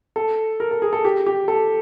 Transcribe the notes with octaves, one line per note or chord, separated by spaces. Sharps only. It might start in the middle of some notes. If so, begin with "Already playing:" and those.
A4
A#4
A4
G#4
A4
G4
G4
A4